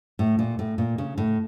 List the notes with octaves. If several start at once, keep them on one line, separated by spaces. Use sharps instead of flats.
A2
A#2
A2
A#2
C#3
A2